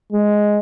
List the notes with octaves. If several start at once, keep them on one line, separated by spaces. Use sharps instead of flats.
G#3